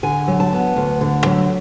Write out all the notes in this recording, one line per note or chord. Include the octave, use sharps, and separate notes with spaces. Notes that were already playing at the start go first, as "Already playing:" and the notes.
D3 G#5
F#3
A5
B3
D2
D3
F#3